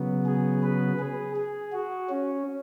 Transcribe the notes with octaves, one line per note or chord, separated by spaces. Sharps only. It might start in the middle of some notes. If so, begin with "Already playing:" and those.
Already playing: C#3 F#3 B3
G#4
B4
G#4
G#4
F#4
C#4